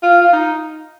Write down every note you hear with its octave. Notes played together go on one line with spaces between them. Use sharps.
F4
F4
D#4